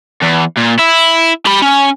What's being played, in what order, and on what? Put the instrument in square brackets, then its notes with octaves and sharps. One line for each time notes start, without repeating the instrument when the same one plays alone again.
[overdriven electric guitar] E2
A#2
E4
G4 B5
C#4